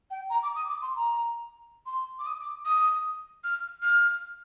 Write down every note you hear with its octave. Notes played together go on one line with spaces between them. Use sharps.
G5
A#5
D6
D#6
D6
C6
A#5
C6
D6
D#6
D6
D#6
F6
F6